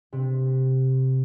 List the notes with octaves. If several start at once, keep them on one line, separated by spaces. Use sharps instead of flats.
C3